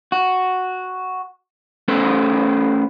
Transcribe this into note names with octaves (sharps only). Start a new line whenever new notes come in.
F#4
A3 C#4 A4 B4 C5